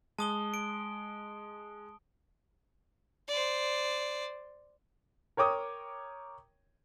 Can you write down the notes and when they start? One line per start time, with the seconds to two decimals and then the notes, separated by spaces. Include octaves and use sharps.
0.19 G#3 A5 D#6 G7
0.54 D7
3.28 C5 D5
5.37 A#4 C#5 G5 D6 D#6